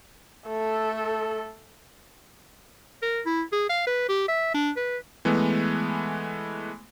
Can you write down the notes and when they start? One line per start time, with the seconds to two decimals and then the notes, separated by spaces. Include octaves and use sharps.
0.47 A3 A4
3.02 A#4
3.26 E4
3.53 G#4
3.69 F5
3.87 B4
4.09 G4
4.28 E5
4.54 D4
4.77 B4
5.25 E3 G#3 A3 B3